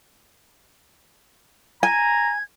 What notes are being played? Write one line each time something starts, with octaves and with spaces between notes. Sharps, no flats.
G#5 A#5 G#6